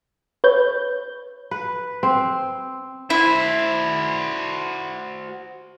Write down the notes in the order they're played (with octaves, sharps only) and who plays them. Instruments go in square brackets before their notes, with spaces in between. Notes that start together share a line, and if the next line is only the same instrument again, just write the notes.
[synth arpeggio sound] B4 C#5 G6
[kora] B4
C4
[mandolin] E4 [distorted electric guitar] F#4 C5